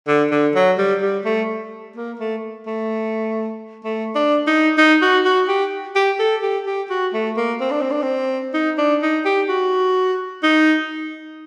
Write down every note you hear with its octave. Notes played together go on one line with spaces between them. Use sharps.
D3
D3
F#3
G3
G3
A3
A#3
A3
A3
A3
D4
D#4
D#4
F#4
F#4
G4
G4
A4
G4
G4
F#4
A3
A#3
C4
D4
C4
D4
C4
D#4
D4
D#4
G4
F#4
D#4